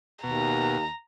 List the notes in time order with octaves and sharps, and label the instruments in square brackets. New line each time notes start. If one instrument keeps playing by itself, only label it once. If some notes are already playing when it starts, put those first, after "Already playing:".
[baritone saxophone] D#2 [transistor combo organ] B2 [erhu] A#5